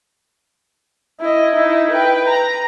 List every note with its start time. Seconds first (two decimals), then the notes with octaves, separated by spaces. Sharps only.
1.20 E4 D#5
1.55 D#4 E4
1.91 B4 G5
2.28 A#5